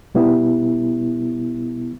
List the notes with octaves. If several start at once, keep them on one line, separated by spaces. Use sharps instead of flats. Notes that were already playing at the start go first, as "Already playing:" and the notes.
B2 G3 B3 E4